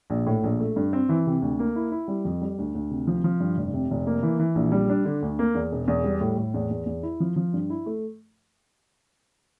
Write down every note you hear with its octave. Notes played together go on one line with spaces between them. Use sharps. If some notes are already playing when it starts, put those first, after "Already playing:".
A#1
A2
A#1
A3
G2
C4
E3
C3
D2
A#3
E4
E4
G3
F2
G3
D2
D2
C3
F3
F3
G2
F1
C3
F1
A#3
E3
E3
A#1
G3
D4
D3
D2
A#3
E2
E1
E2
G3
A2
A2
E2
E2
E2
E4
F3
F3
G2
E4
A3